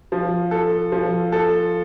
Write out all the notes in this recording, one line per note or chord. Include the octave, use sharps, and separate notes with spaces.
F3
A4
F3
A4